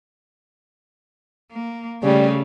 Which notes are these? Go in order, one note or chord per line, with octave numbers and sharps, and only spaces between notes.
A#3
C#3 G3 A3